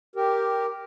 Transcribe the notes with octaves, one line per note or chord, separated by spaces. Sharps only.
G4 A#4